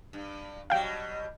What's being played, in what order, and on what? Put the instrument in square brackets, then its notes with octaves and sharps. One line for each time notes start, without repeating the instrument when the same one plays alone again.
[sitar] G2
[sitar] B2 F#3 G3 [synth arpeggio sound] F5 G5